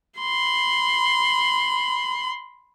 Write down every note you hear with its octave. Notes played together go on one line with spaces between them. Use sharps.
B5 C6